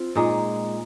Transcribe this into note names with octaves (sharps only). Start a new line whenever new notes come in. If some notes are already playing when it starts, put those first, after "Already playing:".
Already playing: C4 F4
A#2 G#3 D#4